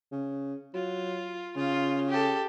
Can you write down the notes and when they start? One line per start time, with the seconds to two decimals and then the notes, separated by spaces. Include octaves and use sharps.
0.12 C#3
0.74 F#3 F4
1.56 C#3 F4
2.10 G4 A4